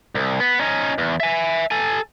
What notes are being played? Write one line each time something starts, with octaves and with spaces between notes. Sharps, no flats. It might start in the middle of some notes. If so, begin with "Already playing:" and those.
C2
B3
C#4 D#4
E2
E5 G#5
A4 G#5